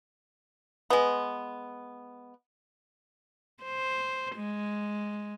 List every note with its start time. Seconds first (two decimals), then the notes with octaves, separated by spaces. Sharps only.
0.90 G#3 B3
3.64 C5
4.36 G#3